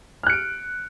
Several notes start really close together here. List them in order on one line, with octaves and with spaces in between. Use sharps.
F6 F#6 C#7 D7